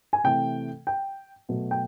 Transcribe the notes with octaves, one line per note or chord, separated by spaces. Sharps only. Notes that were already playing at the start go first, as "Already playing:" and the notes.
G#5
C3 E3 A3 G5
G5
B2 F#3 A3
G5